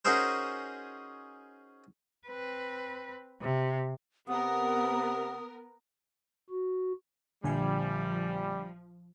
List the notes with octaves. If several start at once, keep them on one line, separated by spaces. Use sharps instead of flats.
C#4 D#4 F#4 G#4 A#4 C5
C4 B4
C3
C3 B3 A#4 F#5 D#6
F#4
A#1 D3 F3 G3 G#5